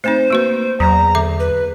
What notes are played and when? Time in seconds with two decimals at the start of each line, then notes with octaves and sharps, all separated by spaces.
0.04 A3 C4 D#4 C5
0.30 A#3 F#4 B4
0.80 E2 F#3 A#5
1.15 D3 E5 D6
1.40 B4